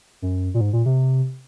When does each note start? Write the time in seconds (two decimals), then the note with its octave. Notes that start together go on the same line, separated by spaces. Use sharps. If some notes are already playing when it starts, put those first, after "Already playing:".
0.22 F#2
0.54 A#2
0.61 G#2
0.73 A#2
0.86 C3